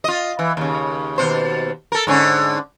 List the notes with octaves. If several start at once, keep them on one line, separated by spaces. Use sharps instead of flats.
F4 D#5
E3
D#2 C#3
D#2 B2 C5
A4 A#4
G#2 D3 C#4